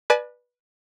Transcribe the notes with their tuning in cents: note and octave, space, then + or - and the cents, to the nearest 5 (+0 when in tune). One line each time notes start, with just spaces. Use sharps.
B4 -15 D5 +25 G#5 +45